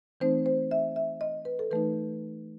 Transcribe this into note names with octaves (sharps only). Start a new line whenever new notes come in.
E3 A3 C4 D#4 C5
C5
E5
E5
D#5
B4
A4
E3 A3 D#4 B4